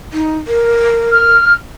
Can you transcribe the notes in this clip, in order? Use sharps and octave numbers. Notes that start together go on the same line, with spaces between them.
D#4
A#4
F6